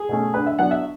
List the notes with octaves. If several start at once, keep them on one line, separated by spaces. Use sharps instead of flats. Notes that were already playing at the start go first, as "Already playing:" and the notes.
Already playing: G#4
B2 A3 C#4
D3 B4
E5
F#3 B3 D4 F#5
E5